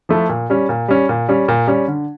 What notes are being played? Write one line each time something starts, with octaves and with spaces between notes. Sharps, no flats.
F3 A3 E4
A#2
G3 C#4
A#2
G3 C#4
A#2
G3 C#4
A#2
G3 C#4
D3